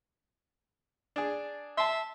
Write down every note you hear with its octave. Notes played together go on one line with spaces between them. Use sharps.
D4 G#4
E5 A5 C6